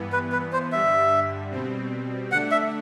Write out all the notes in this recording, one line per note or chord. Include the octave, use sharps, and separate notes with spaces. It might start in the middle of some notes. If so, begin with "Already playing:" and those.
Already playing: G2 E3 B3
B4
B4
C5
G2 D3 G3 E5
B2 G3 C4
D3 A3 D4 F#5
E5